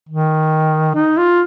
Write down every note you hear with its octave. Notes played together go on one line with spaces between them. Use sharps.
D#3
D#4
F4